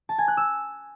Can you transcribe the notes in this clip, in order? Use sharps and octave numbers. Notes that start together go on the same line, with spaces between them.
A5
G#5
F#6
E6